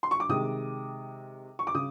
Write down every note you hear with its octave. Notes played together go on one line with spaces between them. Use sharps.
C6
C#6
D6
C3 D#3 G#3 D#6
C#6
D6
C#3 D#6